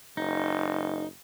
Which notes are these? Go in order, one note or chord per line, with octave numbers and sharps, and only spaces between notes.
F#1 D#4